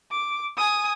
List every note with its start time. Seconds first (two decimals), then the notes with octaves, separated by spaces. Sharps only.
0.12 D6
0.57 G#5 D#6